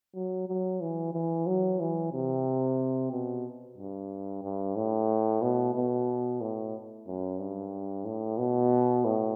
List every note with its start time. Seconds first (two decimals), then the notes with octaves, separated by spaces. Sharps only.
0.15 F#3
0.48 F#3
0.81 E3
1.13 E3
1.47 F#3
1.80 E3
2.13 C3
3.11 B2
3.78 G2
4.43 G2
4.76 A2
5.42 B2
5.75 B2
6.41 A2
7.07 F#2
7.40 G2
8.05 A2
8.38 B2
9.05 A2